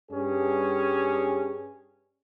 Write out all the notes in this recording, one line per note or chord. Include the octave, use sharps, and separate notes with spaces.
G2 G3 C#4 G#4